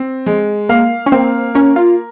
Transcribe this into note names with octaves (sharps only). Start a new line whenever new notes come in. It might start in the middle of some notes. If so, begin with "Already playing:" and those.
Already playing: C4
G#3
A#3 F5
C#4
A#3 C4
C#4 A#4
F4